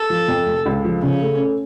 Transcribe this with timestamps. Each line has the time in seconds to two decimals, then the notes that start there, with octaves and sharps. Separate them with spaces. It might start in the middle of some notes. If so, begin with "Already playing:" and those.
Already playing: A4
0.10 F3
0.28 F2
0.46 F1
0.66 C#2
0.85 F3
1.03 C#3 C#4
1.22 A3